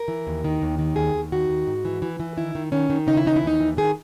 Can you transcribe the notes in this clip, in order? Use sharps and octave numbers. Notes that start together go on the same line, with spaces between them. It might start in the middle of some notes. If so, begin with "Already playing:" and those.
Already playing: A#4
E3
D#2
D#3
D#2
D#3
D#2 G#4
D#2
D#3 F#4
D#2
G#2
E3
E3
E3
D#3 E4
D#3
D#3 C#4
D#3
C#3 D#4
E4
E3 D#4
E4
D#2 D#4
E3
D#3 G#4